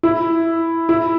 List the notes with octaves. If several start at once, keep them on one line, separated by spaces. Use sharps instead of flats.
E4
E4